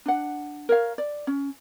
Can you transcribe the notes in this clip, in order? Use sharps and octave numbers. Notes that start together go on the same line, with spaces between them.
D4 F#5
A#4 C#5 F5
D5
C#4